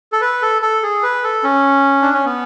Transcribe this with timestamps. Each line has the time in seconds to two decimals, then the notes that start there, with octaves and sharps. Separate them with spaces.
0.12 A4
0.21 B4
0.42 A4
0.62 A4
0.82 G#4
1.03 B4
1.24 A4
1.44 C#4
2.02 D4
2.14 C#4
2.25 B3